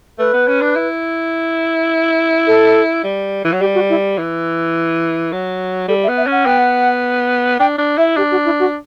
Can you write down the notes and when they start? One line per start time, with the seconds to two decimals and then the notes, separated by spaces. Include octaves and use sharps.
0.19 A3 B4
0.33 B3
0.48 C#4
0.61 D4
0.75 E4
2.47 A4
3.04 G3
3.45 E3
3.52 F#3
3.60 G3 G4
3.74 F#4
3.89 E4
4.18 E3
5.32 F#3
5.88 G3 A4
6.03 E5
6.08 B3
6.17 E5
6.27 C#4
6.32 F#5
6.45 B3 G5
6.59 F#5
7.60 D4 G5
7.78 D4
7.98 E4 E5
8.16 D4 G4
8.31 F#4
8.45 E4
8.59 F#4